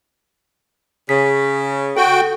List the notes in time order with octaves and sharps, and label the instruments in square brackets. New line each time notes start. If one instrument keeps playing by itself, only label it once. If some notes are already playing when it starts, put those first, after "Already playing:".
[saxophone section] C#3 [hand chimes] B6
[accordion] F#4 G5 [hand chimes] A4